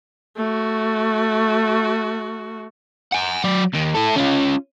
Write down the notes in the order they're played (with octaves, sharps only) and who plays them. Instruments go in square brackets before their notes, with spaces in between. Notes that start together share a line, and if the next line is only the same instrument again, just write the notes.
[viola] A3 F#4
[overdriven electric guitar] F#5 G#5
F#3 D5
D#2 D#3
E4 A4
C#4 F4